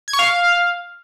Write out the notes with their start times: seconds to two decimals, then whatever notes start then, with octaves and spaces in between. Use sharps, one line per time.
0.08 G#6
0.13 C#6
0.19 F5